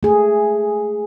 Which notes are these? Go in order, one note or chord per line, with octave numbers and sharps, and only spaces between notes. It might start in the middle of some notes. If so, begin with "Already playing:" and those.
A3 G#4